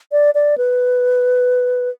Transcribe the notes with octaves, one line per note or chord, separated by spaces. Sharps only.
D5
D5
B4